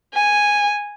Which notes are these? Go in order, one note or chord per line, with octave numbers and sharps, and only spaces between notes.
G#5